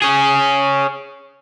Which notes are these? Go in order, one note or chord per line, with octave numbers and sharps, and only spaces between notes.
C#4 G#4